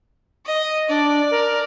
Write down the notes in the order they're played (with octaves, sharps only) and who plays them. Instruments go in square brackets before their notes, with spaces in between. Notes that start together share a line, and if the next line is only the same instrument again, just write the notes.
[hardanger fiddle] D#5
[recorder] D4 [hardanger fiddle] D5
[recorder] A#4